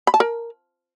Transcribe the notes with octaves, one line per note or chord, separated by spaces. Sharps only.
B5
A5
A#4